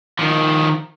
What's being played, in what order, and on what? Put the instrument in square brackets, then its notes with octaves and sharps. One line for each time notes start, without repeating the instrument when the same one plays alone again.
[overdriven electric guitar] D#3 F3